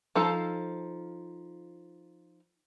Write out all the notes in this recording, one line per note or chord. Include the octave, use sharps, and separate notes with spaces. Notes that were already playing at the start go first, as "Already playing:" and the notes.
F3 D#4 A4 F5